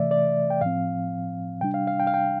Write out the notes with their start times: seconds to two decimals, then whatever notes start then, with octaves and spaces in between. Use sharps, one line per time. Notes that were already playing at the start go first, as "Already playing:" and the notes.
Already playing: C3 E3 A3 D5 E5
0.11 D5
0.50 G5
0.61 A2 F3 C4 F5
1.61 C3 G3 D4 G5
1.74 F5
1.87 F5
2.00 G5
2.07 F5
2.14 G5